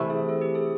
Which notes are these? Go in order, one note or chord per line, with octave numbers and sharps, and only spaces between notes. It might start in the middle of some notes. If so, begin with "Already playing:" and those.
Already playing: C3 E3 A3
G#4
A4
G4
G#4